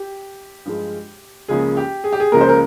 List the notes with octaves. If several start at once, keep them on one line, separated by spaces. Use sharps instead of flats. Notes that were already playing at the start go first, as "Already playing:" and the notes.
Already playing: G4
G2 F3 G#3
C#2 C#3 F3 A#3 G#4
G4
G#4
G4
G#4
C#2 C#3 F3 A#3 A#4
C5
A#4